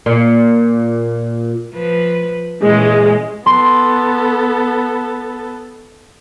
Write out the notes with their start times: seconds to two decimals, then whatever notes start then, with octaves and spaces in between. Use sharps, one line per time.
0.06 A#2
1.74 F3 B4
2.61 A#2 E3 G#3 C#4
3.46 B3 A4 C6